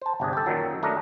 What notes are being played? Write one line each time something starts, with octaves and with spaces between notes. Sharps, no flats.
C5 A5
G1 C3 D4 G#4
G4 A4
F#2 A#2 D#3 F#3
A3 D4 D#4 A#4 D#5